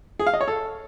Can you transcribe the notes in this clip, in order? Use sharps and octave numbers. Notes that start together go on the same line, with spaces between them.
G#4
F5
D#5
C#5
A4